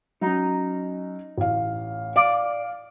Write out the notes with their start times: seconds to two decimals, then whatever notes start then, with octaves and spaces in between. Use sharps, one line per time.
0.21 F#3 C#4 D#4
1.38 A1 F5
2.16 D5 F5